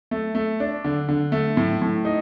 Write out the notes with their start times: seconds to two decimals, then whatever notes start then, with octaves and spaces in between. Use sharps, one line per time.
0.11 A3
0.35 A3
0.60 D4
0.84 D3
1.09 D3
1.32 A3
1.57 A2
1.82 A2
2.05 D#4